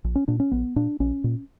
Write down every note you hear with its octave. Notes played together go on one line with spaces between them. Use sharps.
A#1
C#4
A#2 D4
C#4
A#1 B3
A#2 D4
A#1 C#4
A#2